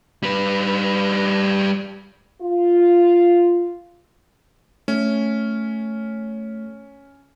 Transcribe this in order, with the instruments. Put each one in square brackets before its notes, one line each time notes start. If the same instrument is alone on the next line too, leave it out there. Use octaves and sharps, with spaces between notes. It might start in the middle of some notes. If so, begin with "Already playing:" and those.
[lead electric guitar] G3 B4
[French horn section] F4
[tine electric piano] A3 [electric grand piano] C#4